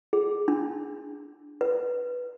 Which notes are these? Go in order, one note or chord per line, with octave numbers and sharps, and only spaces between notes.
G#4
D4
B4